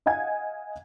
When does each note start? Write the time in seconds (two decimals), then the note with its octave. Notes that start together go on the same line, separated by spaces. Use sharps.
0.06 D#5 F5 F#5 G#5 G#6